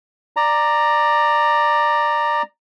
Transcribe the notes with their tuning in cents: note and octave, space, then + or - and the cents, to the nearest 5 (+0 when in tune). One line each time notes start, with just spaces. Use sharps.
D5 +10 A#5 +0